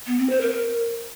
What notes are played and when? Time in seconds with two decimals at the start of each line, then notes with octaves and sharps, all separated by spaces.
0.07 B3
0.18 C4
0.30 C5
0.41 A#4